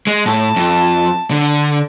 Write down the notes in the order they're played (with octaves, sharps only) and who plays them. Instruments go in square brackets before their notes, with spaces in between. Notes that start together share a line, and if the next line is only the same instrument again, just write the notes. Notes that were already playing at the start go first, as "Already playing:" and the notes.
[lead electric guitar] G#3
[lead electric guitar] A2 [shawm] A5
[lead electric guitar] F2
D3